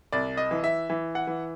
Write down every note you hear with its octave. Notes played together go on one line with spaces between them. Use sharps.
C2 D5
D#5
E3
E5
E3
F#5
E3